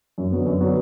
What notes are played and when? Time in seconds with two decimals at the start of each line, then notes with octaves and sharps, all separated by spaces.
0.18 F#2
0.32 D3 F#3 B3
0.46 F#2
0.60 D3 F#3 B3